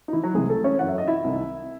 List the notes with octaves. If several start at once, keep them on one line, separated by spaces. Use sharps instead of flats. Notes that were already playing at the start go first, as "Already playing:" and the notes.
D#4
E3 E4
F#3 F#4
C2 C3 E3 G#3 G#4
A3 A4
C#4 C#5
F#2 E3 F#5
E5
D#5
E4 E5
C2 C3 D#3